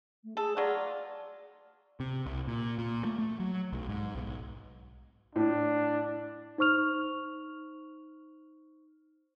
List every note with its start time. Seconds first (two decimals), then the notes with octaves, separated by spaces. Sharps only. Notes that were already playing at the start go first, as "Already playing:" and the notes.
0.24 A3
0.37 G#4 A4
0.57 F#3 F4 D5
2.00 C3
2.26 C2
2.47 A#2
2.79 A#2
3.05 A3
3.19 A3
3.40 F#3
3.72 B1
3.89 G#2
4.15 B1
5.36 A2 D4
6.58 D#4 C5 C#6 F6 F7